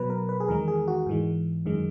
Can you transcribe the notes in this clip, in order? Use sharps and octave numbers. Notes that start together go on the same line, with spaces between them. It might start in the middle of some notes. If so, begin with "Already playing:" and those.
Already playing: B2 F#3 B4
A#4
B4
G#4
E2 D#3 G#3 A#4
G#4
F#4
G#2 E3 G#3
F#2 D#3 G#3